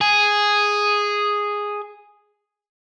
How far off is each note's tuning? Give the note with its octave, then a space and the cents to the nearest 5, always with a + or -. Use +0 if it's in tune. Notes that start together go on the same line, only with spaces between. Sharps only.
G#4 -5